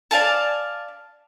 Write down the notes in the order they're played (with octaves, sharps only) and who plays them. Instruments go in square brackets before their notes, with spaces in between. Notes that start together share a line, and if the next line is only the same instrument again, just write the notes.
[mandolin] D5 F5 G#5 A5